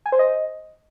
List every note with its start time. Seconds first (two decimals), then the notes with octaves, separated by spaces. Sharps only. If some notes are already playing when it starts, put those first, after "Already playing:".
0.06 G#5
0.12 C5
0.19 D#5